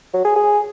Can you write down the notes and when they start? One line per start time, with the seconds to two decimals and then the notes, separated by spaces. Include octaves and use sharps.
0.14 F#3
0.25 G#4
0.36 G#4